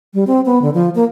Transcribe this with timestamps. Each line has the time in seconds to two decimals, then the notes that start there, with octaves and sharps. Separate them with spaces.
0.14 G3
0.27 C4
0.46 B3
0.62 D3
0.74 F3
0.95 A#3